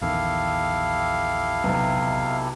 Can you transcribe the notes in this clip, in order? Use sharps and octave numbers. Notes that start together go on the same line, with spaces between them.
A#1 E2 D#3 E4 G4 A4 F5
B1 C3 B3